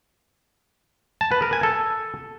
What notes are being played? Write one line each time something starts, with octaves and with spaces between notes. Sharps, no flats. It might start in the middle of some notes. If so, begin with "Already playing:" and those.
A5
B4
A#4
G#5
A4